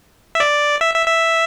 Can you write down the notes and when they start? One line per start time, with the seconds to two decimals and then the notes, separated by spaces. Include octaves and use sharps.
0.35 E5
0.40 D5
0.81 E5
0.94 E5
1.07 E5